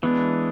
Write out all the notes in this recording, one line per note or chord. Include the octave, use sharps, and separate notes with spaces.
E3 G#3 B3 D4